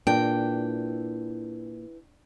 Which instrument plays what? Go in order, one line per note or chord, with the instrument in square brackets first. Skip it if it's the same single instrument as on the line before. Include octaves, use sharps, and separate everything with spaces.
[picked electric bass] A#2 [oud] E3 G#3 [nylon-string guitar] D4 [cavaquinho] G5